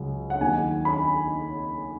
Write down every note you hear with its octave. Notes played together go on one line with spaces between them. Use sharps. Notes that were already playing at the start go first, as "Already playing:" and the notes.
Already playing: C#2 C#3 F#3
F#5
D#2 D#3 F#3 G#5
B5